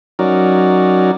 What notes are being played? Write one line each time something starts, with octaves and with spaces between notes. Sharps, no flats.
F#3 C#4 D#4 F#4 A#4 D5